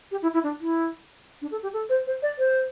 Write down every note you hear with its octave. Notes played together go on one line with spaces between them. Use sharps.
G4
E4
E4
D4
E4
D4
A4
G4
A4
C5
C5
D5
C5